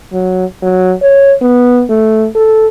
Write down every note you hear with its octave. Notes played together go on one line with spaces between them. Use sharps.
F#3
F#3
C#5
B3
A3
A4